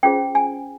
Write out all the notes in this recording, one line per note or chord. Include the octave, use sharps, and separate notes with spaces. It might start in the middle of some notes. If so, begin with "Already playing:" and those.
C#4 F4 G#4 C5 G5
G#5